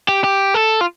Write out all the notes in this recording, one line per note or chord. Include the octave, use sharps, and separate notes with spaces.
G4
G4
A4
F4